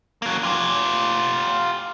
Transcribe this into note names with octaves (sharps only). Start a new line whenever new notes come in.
F#3 A#3
F4 G4